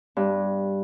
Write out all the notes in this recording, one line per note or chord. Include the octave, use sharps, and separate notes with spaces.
G2